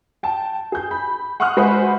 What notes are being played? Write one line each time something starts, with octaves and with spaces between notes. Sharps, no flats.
G5 A5
G#4 G6
B5
F#5 C6 C#6 D#6 F6 F#6
G#3 F#4 B4 C5 E5 F#5